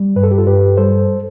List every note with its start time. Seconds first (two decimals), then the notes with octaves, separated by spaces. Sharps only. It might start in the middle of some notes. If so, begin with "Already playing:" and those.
Already playing: G3
0.16 G2 B4
0.23 A4
0.31 G4
0.38 F4 A4
0.47 G2 G4 B4
0.77 G3 A4 C5